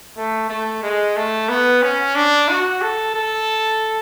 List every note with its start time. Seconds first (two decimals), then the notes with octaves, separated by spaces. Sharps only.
0.17 A3
0.49 A3
0.83 G#3
1.16 A3
1.49 B3
1.82 C#4
2.15 D4
2.48 F#4
2.82 A4
3.14 A4